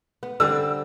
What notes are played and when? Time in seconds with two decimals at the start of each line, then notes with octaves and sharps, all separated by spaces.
0.23 B3
0.40 D3 G3 C4 E6